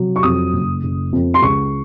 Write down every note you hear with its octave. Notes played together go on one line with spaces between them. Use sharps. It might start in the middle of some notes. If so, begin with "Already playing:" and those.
Already playing: C3 F#3
C#6
F2 D#6
F#1
F#1
F2
C6
C#2 C#6